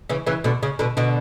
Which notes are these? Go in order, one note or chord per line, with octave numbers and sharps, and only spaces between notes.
C#3 E3
C#3 E3
B2 D3
C#3
B2 D3
B2 D3